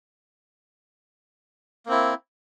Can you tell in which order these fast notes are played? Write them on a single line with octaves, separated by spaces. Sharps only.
A#3 C4 E4